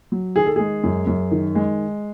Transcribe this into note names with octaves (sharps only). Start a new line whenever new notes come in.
F#3
D#3 G#4
A4
G#3 G#4
F#2
F#2
D#3
G#3